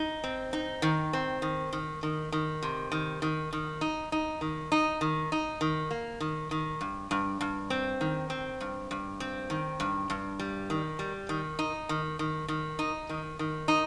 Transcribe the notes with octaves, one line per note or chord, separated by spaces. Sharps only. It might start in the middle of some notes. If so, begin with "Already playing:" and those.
Already playing: D#4
C4
D#4
D#3
C4
D#3
D#3
D#3
D#3
C3
D#3
D#3
D#3
D#4
D#4
D#3
D#4
D#3
D#4
D#3
A#3
D#3
D#3
G2
G2
G2
C4
D#3
C4
G2
G2
C4
D#3
G2
G2
G3
D#3
G3
D#3
D#4
D#3
D#3
D#3
D#4
D#3
D#3
D#4